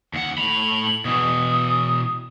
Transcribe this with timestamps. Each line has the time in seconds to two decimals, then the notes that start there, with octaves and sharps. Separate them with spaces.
0.14 D#2 F#5
0.38 A2 B5 F7
0.84 F#7
1.05 B2 E3 D#6